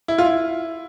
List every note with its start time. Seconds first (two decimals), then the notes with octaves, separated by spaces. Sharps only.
0.08 E4
0.18 F4
0.25 E4